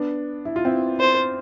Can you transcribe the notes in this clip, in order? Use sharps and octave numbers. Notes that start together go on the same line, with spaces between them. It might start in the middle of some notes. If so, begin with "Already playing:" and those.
Already playing: B3 D4
E4
F4
C4 E4
C5